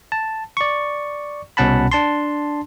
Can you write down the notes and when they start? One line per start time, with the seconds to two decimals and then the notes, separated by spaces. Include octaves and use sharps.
0.12 A5
0.57 D5 C#6
1.57 C2 B2 C#4 F#5 A5 B5
1.92 D4 A5 C6